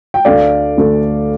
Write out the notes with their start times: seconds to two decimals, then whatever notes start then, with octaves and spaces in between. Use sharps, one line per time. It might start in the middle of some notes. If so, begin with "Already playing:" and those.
0.14 G5
0.25 D2 D3 A3 D5 F5
0.78 D2 D3 A3